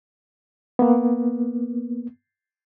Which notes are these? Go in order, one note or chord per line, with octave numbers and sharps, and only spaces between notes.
A#3 B3